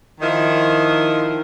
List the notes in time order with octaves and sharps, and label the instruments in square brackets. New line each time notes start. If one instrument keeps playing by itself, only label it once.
[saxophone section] D#3 F3 D#4 E4 A#4